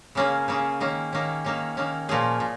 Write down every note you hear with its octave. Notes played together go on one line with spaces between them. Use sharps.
C#3 A#3 C#4 G#4
C#3 A#3 C#4 G#4
D#3 A#3 C#4
D#3 A#3 C#4
D#3 A#3 C#4
D#3 A#3 C#4
A#2 F3 A#3 C#4 G#4
A#2